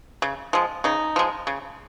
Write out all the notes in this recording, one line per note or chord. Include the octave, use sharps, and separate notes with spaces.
C#3
F3 G#3
C#3 D#4
F3 G#3
C#3